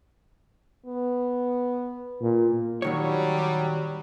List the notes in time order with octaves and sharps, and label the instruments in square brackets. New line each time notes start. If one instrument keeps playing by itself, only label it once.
[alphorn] B3
[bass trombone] A#2
[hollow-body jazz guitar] A#2 D#3 C#5 [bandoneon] F#3 [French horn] G3